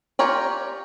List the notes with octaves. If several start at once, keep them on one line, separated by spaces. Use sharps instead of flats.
F4 G4 A#4 C#5 D5